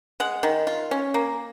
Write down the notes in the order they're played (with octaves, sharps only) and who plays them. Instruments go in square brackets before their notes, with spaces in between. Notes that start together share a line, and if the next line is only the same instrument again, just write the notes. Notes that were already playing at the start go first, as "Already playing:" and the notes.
[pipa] G#3 F#5
D#3
F4
C#4
A#3